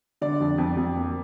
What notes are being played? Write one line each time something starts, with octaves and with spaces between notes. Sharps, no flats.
D3 D5
F2
F2
F2
A#3